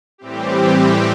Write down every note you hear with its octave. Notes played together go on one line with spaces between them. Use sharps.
A2 E3 G3 C4 G4